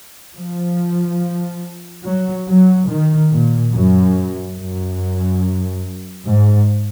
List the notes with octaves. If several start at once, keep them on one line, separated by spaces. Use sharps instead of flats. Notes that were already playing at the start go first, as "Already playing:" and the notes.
F3
F#3
F#3
D#3
A#2
F#2
F#2
G#2